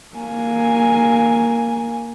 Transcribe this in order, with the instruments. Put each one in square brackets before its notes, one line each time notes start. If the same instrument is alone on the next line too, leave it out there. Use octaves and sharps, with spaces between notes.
[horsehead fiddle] A#3 G#5